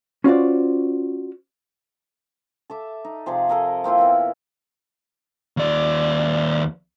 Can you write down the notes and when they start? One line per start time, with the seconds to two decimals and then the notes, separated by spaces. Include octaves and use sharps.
0.24 C#4 F4 F#4 C5 D5
2.70 A4 E5 D6
3.05 D#4
3.26 C3 F3 G#4 D5
3.48 A4 A#4 D#5 G#5
3.84 A#3 C4 E4 F4
3.98 A#2 E3 B3
5.57 D#2 D5